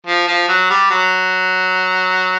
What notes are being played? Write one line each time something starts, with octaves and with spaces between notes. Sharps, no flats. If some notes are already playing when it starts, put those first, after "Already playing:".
F3
F3
F#3
G3
F#3